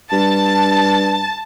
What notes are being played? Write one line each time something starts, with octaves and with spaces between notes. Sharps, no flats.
G2 A5